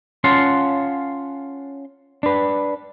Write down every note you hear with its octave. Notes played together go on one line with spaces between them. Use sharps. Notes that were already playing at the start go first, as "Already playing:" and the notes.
C#4 F4 F5 F#5 A5 C6
D4 B4